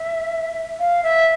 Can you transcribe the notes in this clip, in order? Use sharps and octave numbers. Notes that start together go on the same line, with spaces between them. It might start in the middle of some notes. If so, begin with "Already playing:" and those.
Already playing: E5
F5
E5